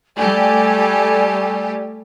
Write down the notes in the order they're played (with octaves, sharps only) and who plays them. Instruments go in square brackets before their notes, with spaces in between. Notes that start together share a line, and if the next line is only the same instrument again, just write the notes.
[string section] G3 A3 G4 [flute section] D5 G#5